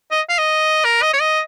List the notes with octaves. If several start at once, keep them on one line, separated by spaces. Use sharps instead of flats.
D#5
F5
D#5
A#4
D#5
C#5
D#5